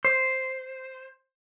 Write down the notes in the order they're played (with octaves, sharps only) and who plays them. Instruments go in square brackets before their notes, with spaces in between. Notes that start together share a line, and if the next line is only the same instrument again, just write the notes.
[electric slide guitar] C5